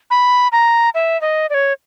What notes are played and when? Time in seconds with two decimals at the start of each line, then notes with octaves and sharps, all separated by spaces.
0.10 B5
0.52 A#5
0.95 E5
1.21 D#5
1.50 D5
1.54 C#5